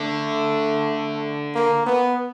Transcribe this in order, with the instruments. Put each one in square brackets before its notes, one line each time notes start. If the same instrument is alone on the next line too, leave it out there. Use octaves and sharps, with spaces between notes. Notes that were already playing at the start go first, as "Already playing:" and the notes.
Already playing: [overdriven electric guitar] D3 [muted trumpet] A3
[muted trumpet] A#3
B3